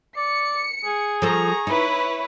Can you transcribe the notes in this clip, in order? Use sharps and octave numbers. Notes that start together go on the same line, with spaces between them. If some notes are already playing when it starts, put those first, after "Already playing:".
D5 C#7
G#4
F3 A4 A#5 C#6
D#4 E4 B4 C#5